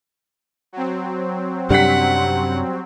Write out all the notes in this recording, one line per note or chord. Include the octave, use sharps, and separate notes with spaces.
F#3 C4
F#2 C3 G3 D4 F#5 B6